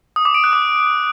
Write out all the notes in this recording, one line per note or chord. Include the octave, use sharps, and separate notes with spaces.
D#6
D6
D7
F#6
D6